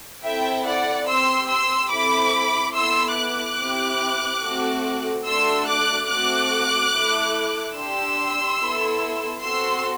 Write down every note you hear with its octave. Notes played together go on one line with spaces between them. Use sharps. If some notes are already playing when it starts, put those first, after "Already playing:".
C4 E4 A4 E5 G5
D5 F#5
C4 G4 C6 E6
C6 E6
C4 E4 A4 B5 D6
B3 E4 A4 C6 E6
D6 F#6
C4 E4 G4
A3 C4 F#4 A4
A3 D4 F#4 A4 C6 E6
D6 F#6
A3 C4 F#4 A4 D6 F#6
A3 E4 A4
D4 G4 C6 E6
B3 E4 A4
C4 F#4 A4 C6 E6